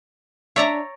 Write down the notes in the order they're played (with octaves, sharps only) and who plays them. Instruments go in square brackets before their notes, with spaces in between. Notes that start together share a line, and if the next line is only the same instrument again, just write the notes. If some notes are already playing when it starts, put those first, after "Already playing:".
[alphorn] D4 [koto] C#5 D5 A#5 [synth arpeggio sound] E5